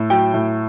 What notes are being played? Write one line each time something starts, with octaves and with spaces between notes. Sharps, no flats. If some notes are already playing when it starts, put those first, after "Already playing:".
Already playing: A2
F#3 G5
A2